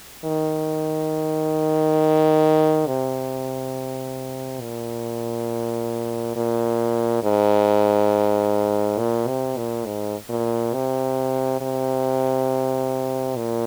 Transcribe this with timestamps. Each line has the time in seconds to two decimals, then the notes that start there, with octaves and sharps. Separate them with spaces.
0.25 D#3
2.87 C3
4.61 A#2
6.36 A#2
7.23 G#2
8.99 A#2
9.27 C3
9.57 A#2
9.86 G#2
10.29 A#2
10.74 C3
11.61 C3
13.36 A#2